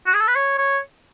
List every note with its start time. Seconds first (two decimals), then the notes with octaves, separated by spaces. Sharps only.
0.07 F#4
0.14 G#4
0.21 A4
0.27 B4
0.35 C#5
0.58 C#5